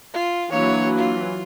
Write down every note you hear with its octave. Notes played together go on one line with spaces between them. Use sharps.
F4
E3 F#3 A#3 D4 C#5 F5
F4